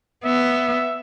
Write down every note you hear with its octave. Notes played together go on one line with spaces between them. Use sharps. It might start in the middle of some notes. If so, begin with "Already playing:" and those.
B3 E5